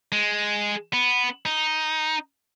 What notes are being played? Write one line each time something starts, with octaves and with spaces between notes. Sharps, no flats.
G#3
B3
D#4